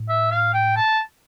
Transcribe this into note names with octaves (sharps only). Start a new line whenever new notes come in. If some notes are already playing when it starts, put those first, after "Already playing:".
Already playing: A2
E5
F5
G5
A5